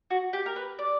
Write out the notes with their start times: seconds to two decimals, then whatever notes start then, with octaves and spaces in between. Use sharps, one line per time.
0.10 F#4
0.33 G4
0.46 A#4
0.56 B4
0.79 D5